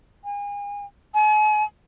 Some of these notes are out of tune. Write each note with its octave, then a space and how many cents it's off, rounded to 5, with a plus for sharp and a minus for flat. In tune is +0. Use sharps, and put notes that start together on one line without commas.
G#5 -35
G#5 +40